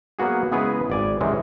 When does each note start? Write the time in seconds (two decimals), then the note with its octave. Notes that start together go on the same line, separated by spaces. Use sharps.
0.19 F#3 A#3 B3 F#4 G#4
0.52 C#3 G#3 B3 E4 G#4 B4
0.90 G#1 D5 G#5
1.21 C3 E3 F#3 G#3 C4 C#4